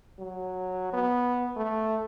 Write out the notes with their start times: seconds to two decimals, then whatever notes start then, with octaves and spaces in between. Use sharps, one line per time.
0.19 F#3
0.93 B3
1.57 A3